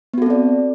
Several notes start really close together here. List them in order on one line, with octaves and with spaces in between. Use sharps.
B3 F#4 A4 C4 D5